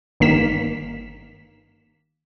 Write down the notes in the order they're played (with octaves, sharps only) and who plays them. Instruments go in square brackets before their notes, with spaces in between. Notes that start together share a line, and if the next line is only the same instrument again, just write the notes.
[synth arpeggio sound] G1 D#3 A#3 B6 E7